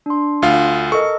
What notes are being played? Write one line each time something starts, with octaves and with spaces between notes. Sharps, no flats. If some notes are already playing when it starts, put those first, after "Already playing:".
D4 C6
D2 F4 F5
A4 A#4 D#5 C#6